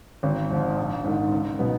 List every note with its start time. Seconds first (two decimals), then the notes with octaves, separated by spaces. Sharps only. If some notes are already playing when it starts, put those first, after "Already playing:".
0.23 G#1
0.50 G#2 F3
0.77 A#1
1.04 G#2 D#3
1.32 C#2
1.59 B2 F#3 B3 D#4